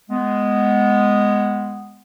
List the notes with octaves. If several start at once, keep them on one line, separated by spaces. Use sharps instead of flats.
G#3 B3